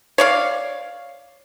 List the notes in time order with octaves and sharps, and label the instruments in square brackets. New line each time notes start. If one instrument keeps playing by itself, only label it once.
[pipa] C#5 D5 F5